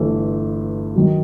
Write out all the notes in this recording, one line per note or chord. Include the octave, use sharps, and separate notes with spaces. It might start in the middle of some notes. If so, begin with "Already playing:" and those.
Already playing: G1 G2 E3 A3
D#3 F#3